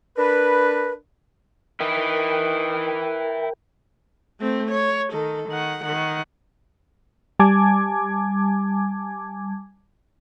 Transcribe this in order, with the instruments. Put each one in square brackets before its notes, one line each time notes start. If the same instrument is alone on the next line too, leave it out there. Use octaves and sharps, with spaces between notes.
[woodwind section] D4 A#4 B4
[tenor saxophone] D#3 [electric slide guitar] E4 B4 [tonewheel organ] A#4 G5
[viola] A3 C4
C#5
D#3 A4
D#3 F#5
D#3 F#5
[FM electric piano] G3 G#5 A5 D6 G#6